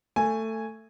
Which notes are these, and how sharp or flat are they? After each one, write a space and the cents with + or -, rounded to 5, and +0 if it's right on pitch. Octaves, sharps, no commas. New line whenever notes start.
A3 +15 G#5 -5